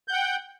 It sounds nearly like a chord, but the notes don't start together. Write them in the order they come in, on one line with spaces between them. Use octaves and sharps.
G6 F#5 G5